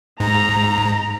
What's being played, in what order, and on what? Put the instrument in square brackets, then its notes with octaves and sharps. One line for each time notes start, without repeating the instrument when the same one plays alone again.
[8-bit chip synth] G#2 [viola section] A#5